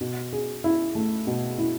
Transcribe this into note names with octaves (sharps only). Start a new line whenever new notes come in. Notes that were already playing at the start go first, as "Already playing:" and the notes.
B2
G#4
E4
A3
B2
E4